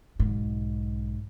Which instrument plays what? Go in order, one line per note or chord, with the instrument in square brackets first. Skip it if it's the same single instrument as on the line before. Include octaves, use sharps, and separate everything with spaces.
[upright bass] B1 G#2